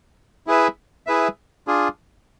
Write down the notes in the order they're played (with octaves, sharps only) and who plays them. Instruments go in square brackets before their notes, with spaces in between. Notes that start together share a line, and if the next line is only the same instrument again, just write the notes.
[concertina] E4 G#4 B4 E5
E4 G#4 B4 E5
D4 F4 G#4